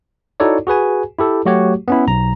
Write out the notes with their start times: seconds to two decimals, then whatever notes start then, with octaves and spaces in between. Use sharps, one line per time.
0.40 D#4 E4 F#4 A4 C#5 D5
0.67 F#4 G#4 B4 G#5
1.19 E4 G4 A4
1.45 F#3 A3 F#4 G4 C#5
1.88 B3 C#4 E4
2.07 B1 A#5